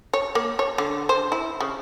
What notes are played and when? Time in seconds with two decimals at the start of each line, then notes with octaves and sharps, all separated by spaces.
0.13 C#5
0.35 A#3
0.59 C#5
0.78 D3
1.09 C5
1.32 E4
1.60 C#3